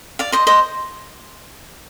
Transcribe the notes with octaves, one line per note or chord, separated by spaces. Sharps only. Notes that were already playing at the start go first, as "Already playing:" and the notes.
D5 F5
C5 D#5
C5 D#5